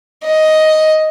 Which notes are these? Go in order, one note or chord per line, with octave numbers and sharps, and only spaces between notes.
D#5